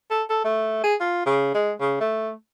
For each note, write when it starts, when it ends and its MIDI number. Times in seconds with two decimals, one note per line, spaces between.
0.11 0.23 69
0.30 0.40 69
0.44 0.82 57
0.84 0.95 68
1.01 1.25 65
1.26 1.50 49
1.54 1.72 56
1.81 1.97 49
2.01 2.32 57